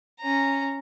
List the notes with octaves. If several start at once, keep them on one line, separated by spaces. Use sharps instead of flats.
C#4 A#5